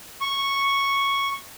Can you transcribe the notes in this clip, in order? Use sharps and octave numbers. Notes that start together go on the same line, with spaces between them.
C#6